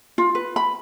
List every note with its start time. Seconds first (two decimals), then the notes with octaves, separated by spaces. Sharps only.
0.18 F4
0.35 B4
0.56 B5